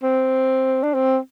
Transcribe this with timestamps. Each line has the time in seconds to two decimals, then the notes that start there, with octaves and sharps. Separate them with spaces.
0.03 C4
0.84 D4
0.94 C4